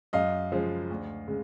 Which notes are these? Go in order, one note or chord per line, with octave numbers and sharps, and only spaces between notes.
F#2 D#5 F5
C#3 F3 G#3
D2
C#3 G#3